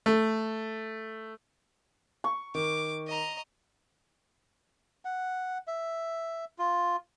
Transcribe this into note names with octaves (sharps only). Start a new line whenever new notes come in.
A3
C#6
D#3 D6
D#5 A#5
F#5
E5
F4